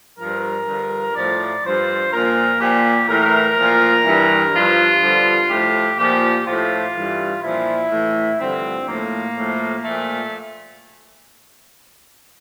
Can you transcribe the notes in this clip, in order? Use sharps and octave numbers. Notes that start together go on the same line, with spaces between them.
G2 F3 A#4
G2 D3 F3
A2 F3 D5
G2 F3 C5
A#2 F3 A#4
A#2 F3 G4
A2 E3 A#4
A#2 F3
G2 E3
G2 F3 F4
G2 D3 F3
A2 F3 G4
A#2 F3 G4
A2 F3 F4
G2 E3
A#2 F3 E4
A2 E3
G2 D3 F3 C4
A2 F3 A#3
A2 F3
A#2 F3 A3